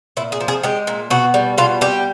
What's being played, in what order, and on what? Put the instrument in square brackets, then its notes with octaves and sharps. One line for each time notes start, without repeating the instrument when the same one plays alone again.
[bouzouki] A#2 E4
G#4
F3
G#4
G#3 G4
A#2
B2 F#4
G3
B2 F4
G3 G4